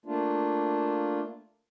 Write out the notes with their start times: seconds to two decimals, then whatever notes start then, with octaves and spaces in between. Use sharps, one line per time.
0.06 A3 A#3 D4 F4